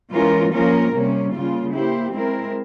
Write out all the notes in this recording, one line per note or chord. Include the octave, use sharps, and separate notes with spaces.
E3 G#3 C#4 F4 A#4
F3 A#3 C#4 F4 A#4
C3 G3 A#3 C#4
C#3 G3 A#3 F4
A#3 E4 G4 C5
G#3 C4 E4 A#4